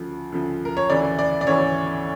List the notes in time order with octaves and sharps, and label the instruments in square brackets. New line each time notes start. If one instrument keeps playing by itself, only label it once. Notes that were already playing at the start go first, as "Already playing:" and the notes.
Already playing: [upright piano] D2 C#3 F3
D2 C#3 F3
A#4
C#5
D2 C#3 E3 D5
D5
D5
D2 C#3 E3 C#5